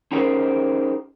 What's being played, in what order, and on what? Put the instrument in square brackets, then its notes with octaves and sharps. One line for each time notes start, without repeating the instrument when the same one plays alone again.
[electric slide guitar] C#4 D#4 G4 G#4 A#4 C5